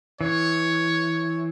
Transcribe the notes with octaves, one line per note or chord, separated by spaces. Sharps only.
E3 C#5